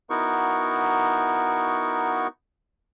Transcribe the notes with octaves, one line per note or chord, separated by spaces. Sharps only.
B3 D#4 E4 F#4 A#4 C#6